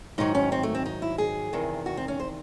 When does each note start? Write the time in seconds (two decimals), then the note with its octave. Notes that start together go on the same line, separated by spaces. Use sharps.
0.18 G#2 D#3 F#3 D#4
0.35 C#4
0.52 C4
0.63 A3
0.75 C4
0.86 D#4
1.02 E4
1.18 G#4
1.53 E2 C3 D#3
1.86 F#4
1.97 C4
2.08 C#4
2.20 C5